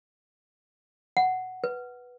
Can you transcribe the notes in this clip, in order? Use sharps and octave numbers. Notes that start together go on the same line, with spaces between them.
F#5
B4